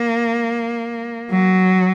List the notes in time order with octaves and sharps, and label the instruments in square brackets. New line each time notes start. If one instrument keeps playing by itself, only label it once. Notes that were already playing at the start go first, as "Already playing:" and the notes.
Already playing: [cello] A#3
F#3